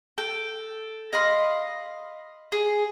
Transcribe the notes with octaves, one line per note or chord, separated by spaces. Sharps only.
A4 G5
D#5 F5 B5 C6
G#4